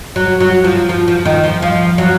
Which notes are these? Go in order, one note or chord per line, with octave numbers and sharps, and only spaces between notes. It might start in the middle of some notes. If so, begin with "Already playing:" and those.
F#3
F#3
F3
F3
F3
D#3
F3
F3 F5
F#3